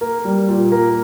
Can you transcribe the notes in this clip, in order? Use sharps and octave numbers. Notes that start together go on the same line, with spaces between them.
A#3
G3
A#2
A#3